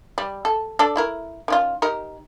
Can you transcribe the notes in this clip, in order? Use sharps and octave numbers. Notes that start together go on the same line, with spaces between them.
G3
A4
D4 A4
A3 E4 A#4
D#3 C#4 F4
D#4 G4 A#4